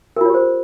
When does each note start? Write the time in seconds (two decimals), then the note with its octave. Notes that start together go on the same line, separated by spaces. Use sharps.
0.17 A#4
0.21 F4
0.25 C#5
0.30 G4
0.34 C5